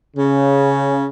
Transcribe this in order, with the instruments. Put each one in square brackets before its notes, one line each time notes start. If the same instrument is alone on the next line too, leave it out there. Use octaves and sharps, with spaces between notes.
[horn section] C#3